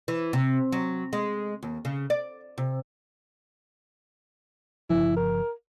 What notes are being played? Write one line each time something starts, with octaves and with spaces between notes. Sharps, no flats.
E3
C3
F#3
G#3
D#2
C#3
D5
C3
G1 C#3 F3 E4
A#4